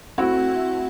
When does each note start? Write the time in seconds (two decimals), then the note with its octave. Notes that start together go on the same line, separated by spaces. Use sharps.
0.18 A3 C4 E4 F#4